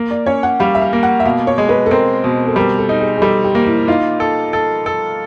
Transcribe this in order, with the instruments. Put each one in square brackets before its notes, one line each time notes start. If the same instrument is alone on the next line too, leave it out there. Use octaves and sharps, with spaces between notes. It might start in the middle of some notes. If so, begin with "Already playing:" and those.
Already playing: [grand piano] A#3
[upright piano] D5
[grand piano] C#4 [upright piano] C#5
[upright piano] F#5
[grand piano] G3 [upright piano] F5
[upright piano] E5
F5
[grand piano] A#3
[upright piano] F#5
E5
[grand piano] B2 [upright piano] F5
[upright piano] C#5
[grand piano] G#3
[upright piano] B4
A4
[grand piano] C4 [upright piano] A#4
[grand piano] B2
[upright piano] A4
[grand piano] G3 [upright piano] A#4
[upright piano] A4
[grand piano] D#4
[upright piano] G#4
G#4
[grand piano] G3 [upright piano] A4
[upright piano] G4
[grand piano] A#3
[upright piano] E4
E4
[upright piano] D#4 [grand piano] F4
[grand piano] A4
A4
A4